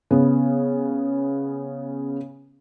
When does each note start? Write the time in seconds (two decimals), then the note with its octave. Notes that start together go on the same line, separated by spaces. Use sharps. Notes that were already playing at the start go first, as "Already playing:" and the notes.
0.11 C#3 B3